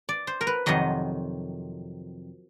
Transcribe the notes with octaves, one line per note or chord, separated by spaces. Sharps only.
D5
C5
A#4
B4
F2 C3 D#3 F#3 D#5